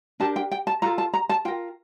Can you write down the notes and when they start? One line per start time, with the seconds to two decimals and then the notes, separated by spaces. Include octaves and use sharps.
0.20 D4 G4 A#4 A5
0.36 G5
0.52 G5
0.67 A5
0.82 F4 A4 A#5
0.98 A5
1.14 A#5
1.29 A5
1.45 F4 G5
1.48 A#4